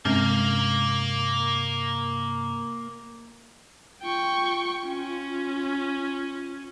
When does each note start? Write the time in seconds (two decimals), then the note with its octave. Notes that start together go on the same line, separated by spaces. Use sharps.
0.05 G2 C3 G#3 A#3 C4 C#4 F5
4.03 F4 G5 C#6
4.88 C#4